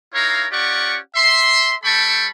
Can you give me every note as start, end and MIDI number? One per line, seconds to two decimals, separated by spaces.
0.13 0.45 63
0.13 0.45 64
0.13 0.45 70
0.13 0.45 73
0.13 0.45 77
0.51 0.97 61
0.51 0.97 65
0.51 0.97 67
0.51 0.97 74
0.51 0.97 78
0.51 0.97 85
1.15 1.73 76
1.15 1.73 84
1.84 2.27 55
1.84 2.27 69
1.84 2.27 79
1.84 2.27 81
1.84 2.27 83
1.84 2.27 85